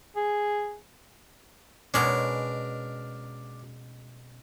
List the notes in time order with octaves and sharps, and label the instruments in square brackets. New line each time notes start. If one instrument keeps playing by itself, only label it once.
[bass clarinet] G#4
[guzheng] B2 G#3 C#4 [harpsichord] D4 A#4